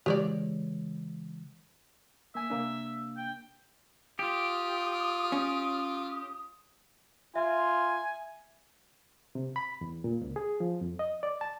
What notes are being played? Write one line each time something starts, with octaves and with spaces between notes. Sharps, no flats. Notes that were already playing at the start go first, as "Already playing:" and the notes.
C#3 E3 G#3 G4 C#5 D5
A#3 E5 G#5
C3 A#3 D4
G5
F4 G4 D#6
C#4
F4 E5 G#5
C3
B5
E2
A#2
C#2
G#4
F3
F2
D#5
D5
A5